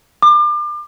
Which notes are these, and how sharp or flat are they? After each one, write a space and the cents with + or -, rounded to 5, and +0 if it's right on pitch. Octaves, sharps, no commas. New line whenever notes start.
D6 +35